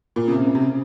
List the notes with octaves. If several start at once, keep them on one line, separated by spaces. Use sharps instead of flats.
A#2
C#3
C3
C#3
C3
C#3